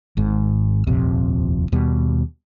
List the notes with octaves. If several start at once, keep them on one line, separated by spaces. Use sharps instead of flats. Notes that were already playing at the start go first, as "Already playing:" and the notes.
G#1 G#2
D#1 A#1 F2 C3
D#2 B2 G3